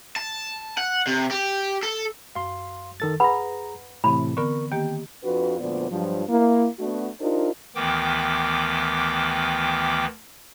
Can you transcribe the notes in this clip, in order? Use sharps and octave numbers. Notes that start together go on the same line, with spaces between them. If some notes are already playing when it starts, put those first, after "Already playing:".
A5
F#5
C3
G4
A4
F#2 F5 C6
D#3 A4 A6
G#4 B4 F#5 A#5 B5
A2 C3 E3 C4 B5
D3 B3 A#4 C#6
D#3 A#3 G4 G5
F2 D4 F4 F#4 B4
D2 A#2 F3 B3 C5 D5
G2 F3 F#3
A#3 E4
A3 B3 D4 F#4
D4 D#4 F4 G4 A#4 C5
D2 D#3 E3 B3 G5 D6